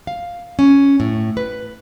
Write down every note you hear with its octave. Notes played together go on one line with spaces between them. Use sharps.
F5
C#4
A2
B4